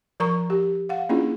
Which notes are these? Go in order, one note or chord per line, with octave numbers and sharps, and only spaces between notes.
F3 A#4 A#5 C#6
G4
F5 F#5
A#3 C#4 D4 E4 F4 G#4